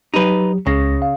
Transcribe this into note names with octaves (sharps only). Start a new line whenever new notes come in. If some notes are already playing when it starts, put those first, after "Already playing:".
F#3 D#4 G4 B4
C#2 C#3 A#6
F5